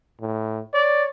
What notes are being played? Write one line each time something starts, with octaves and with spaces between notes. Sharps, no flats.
A2
C#5 D5